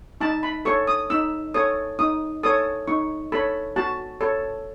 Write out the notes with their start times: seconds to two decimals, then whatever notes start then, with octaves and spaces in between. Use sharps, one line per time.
0.21 D#4 A5
0.43 B5
0.65 A4 C#5 C#6
0.87 D#6
1.10 D#4 E6
1.54 A4 C#5 D#6
1.99 D#4 D#6
2.43 A4 C#5 D#6
2.87 D#4 C#6
3.32 A4 C#5 B5
3.76 F#4 A5
4.21 A4 C#5